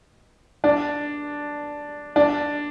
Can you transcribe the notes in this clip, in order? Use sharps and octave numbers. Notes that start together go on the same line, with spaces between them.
D4
D4